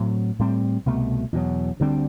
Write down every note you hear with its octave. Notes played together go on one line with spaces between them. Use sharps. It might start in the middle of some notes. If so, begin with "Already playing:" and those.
Already playing: A2 F#3 C4
A2 G3 C4
C2 B2 A3
E2 B2 F#3
D2 D3 G3 C4